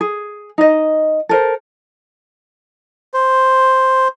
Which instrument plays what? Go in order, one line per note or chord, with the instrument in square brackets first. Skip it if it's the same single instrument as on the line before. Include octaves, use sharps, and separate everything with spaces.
[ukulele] G#4
D#4 D#5
A4 A#4 C5
[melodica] C5